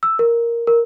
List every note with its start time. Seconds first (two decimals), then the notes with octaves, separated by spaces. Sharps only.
0.03 E6
0.19 A#4
0.67 A#4